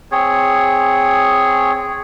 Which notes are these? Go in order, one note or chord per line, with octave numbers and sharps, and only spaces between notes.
C4 G#4 C#5